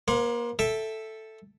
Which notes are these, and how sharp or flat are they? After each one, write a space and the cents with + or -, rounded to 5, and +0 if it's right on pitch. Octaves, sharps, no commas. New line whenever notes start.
A#3 +30 C5 +0 F#5 -45
A4 +0 E5 +0 G5 +20